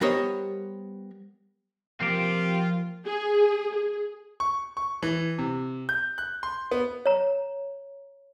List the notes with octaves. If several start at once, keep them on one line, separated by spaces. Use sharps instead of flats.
G3 B3 A#4 C5 C#5 D#5
F3 A#3 C4 F4 G4
G#4
G#4
C#6
C#6
E3
C3
G6
F#6
C6
B3
C#5 A#5